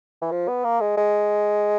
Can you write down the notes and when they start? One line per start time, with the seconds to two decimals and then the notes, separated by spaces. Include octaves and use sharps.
0.22 E3
0.32 F3
0.48 B3
0.64 A#3
0.81 G#3
0.97 G#3